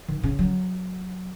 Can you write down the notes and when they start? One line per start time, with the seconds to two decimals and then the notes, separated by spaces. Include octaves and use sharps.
0.08 D#3
0.23 C#3
0.39 F#3